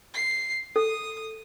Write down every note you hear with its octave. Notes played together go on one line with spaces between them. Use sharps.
C7
A4 D#6